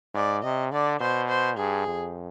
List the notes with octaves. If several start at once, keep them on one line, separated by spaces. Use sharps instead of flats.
G#2 D5
C3 D#5
D3 D5
B2 C5
C5
G2 G#4
F2